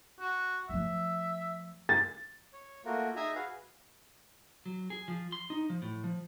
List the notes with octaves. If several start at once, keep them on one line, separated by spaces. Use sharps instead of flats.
F#4
F3 A3 E5
A6
C#5
A3 A#3 F4 F#4 A#4
D#4 G#4 E5 G#5 A#5
F#4 G#4 B4 F5
F#3
G#4
F3
C6
D#4
F3
A2
F3